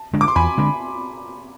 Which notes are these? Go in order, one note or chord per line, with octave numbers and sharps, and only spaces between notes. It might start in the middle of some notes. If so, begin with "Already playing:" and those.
Already playing: A5
D3 G#3 D4
D6
C6
E2 G#5 B5
D3 G#3 D4